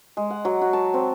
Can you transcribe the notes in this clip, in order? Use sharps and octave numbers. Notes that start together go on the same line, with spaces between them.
G#3
F#5
F#3
F#4
A5
C4